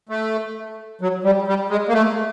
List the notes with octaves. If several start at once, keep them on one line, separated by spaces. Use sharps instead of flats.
A3
F#3
G3
G3
G#3
A#3
A3